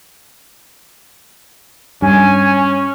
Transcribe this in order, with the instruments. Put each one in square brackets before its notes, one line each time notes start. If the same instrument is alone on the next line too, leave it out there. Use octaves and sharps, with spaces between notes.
[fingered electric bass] G2 [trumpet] C#4 [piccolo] G#5